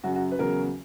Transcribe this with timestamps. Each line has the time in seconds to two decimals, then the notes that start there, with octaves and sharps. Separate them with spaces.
0.04 F#2 C#3 F#3 F#4
0.16 F#4
0.32 B4
0.39 E2 C#3 F#3 A#4